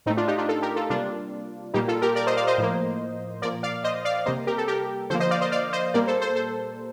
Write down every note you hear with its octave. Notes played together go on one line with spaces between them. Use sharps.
A2 A3 C4 D#4
D4 F4
D#4 G4
D4 F4
F4 A4
G4 A#4
F4 A4
C3 G3 A#3 D4 F4
A#2 G3 A#3 D#4 G4
F4 A4
G4 A#4
A#4 D5
C5 D#5
D5 F5
C5 D#5
A2 F3 A#3
A#2 F3 A#3 A#4 D5
D5 F5
C5 D#5
D5 F5
C3 G3 A#3 C5 D#5
G4 A#4
A4
G4 A#4
D3 F3 A#3 A4 C5
C5 D#5
D5 F5
C5 D#5
D5 F5
C5 D#5
A#2 G3 A#3 A#4 D5
A4 C5
A4 C5
A4 C5